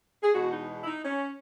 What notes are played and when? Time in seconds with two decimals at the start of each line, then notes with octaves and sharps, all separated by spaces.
0.23 G#4
0.33 E2 B2 G#3 F#4
0.52 D#4
0.83 E4
0.87 D#4
1.05 C#4